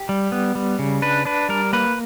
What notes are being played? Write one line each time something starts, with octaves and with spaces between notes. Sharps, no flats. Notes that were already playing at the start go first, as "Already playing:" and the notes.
Already playing: G4
G3
B3
G3
C#3
D4 B4
D4 B4
G3 A#4
A#3 B4